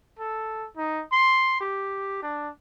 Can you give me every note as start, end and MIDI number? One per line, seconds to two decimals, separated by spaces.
0.19 0.67 69
0.77 1.03 63
1.12 1.57 84
1.61 2.21 67
2.22 2.49 62